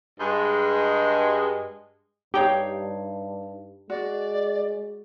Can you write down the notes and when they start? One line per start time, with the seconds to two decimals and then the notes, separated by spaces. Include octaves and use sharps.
0.20 G2 G#3
2.34 G2 D#4 G4 C#5 F5 G5
3.90 G#3 F#4 D5